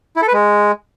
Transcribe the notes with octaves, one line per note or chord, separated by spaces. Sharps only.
E4
A4
B4
G#3